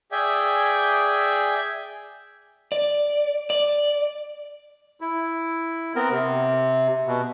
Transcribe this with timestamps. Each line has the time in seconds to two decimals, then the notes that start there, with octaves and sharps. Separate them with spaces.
0.12 G#4 D5 E5 G5 G#5
2.72 D5
3.50 D5
5.01 E4
5.96 B3 C4 A#4
6.11 C3
7.07 B2